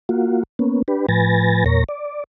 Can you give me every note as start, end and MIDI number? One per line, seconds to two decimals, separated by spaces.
0.09 0.43 58
0.09 0.43 65
0.09 0.43 66
0.59 0.82 58
0.59 0.82 59
0.59 0.82 61
0.88 1.06 62
0.88 1.06 67
0.88 1.06 71
1.09 1.64 45
1.09 1.64 53
1.09 1.64 71
1.09 1.64 80
1.09 1.64 93
1.09 1.64 94
1.66 1.84 40
1.66 1.84 46
1.66 1.84 70
1.66 1.84 73
1.66 1.84 94
1.89 2.24 74